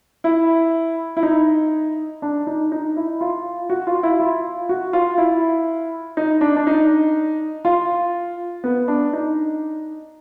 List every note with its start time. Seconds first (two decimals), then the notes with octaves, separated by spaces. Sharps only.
0.24 E4
1.17 E4
1.23 D#4
2.22 D4
2.47 D#4
2.72 D#4
2.97 E4
3.21 F4
3.70 F#4
3.87 F4
4.03 E4
4.20 F4
4.69 F#4
4.93 F4
5.18 E4
6.17 D#4
6.41 D4
6.56 D4
6.67 D#4
7.65 F4
8.64 B3
8.88 D4
9.13 D#4